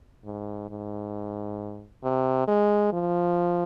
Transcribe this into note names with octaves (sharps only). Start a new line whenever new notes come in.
G#2
G#2
C3
G#3
F3